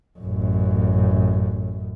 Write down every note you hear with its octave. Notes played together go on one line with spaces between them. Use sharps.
A1 F#2